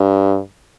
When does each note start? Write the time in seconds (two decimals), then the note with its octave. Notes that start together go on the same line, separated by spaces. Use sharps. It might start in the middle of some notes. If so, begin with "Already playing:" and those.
Already playing: G2